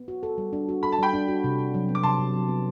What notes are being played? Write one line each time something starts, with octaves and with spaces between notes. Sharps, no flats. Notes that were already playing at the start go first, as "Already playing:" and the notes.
Already playing: B3
F#4
A4
G3
D4
F#4
A4 B5
A5
G3 G5 B5
D4
F#4
C3
C3
F#3
B3
D6
C3 A5 C6
C3
F#3
B3